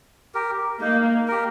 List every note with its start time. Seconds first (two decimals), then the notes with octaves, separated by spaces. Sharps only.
0.34 G4 A#4
0.81 A#3 D#4
1.28 G4 A#4